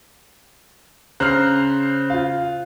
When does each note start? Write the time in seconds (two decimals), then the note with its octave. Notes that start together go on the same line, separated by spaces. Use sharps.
1.20 C#3 C5 A#5 F6 F#6 C7
2.10 F4 F5